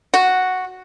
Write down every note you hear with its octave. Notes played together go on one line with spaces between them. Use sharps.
F#4